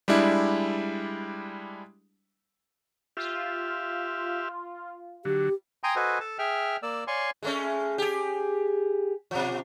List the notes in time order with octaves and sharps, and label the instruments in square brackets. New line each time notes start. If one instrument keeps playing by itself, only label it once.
[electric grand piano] G3 G#3 D4 E4
[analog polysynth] F4 [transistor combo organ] G4 E5 F5
[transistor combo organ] D3 F#3 [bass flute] G4
[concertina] G5 G#5 A#5 C6 D#6
F#4 A4 B4 C5 D#5 G#5
A4 A5
G#4 E5 G5 F6
A#3 D5 E6
C#5 D5 F5 G#5 C6 C#6
[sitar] G#3 A3 C#4
G4 G#4
B2 F3